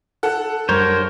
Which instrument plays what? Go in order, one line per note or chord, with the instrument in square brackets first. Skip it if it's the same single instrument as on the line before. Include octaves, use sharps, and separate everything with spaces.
[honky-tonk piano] A4 F#5
[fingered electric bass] F#2 G3 [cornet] A#4 [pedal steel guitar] C5 C#5